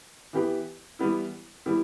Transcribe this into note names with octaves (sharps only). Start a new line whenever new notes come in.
E3 B3 G4 B4
E3 G3 B3 E4
E3 G3 B3 E4